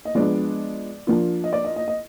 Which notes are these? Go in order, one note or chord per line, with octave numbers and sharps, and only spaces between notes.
D#5
F3 G#3 B3 D4 D5
F3 A#3 D4 F4
D#5
D5
D#5
D#5
D#5